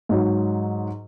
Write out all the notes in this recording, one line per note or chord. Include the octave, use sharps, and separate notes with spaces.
G#2 F#3